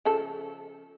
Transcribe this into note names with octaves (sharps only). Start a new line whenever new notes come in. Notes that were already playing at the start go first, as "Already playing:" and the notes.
C#3 F3 A4